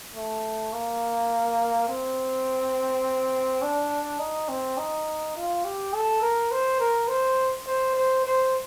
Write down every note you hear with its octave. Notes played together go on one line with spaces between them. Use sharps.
A3
A#3
C4
D4
D#4
C4
D#4
F4
G4
A4
A#4
C5
A#4
C5
C5
C5
C5